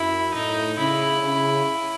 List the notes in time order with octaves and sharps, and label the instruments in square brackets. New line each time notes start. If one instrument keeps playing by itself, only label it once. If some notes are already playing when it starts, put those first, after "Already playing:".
Already playing: [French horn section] F#2 [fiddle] E4
[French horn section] A2 [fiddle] D#4
[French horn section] C#3 [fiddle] E4
[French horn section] C#3